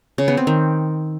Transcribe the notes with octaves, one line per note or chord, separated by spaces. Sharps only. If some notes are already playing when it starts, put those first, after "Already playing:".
C#3
B3
C4
D#3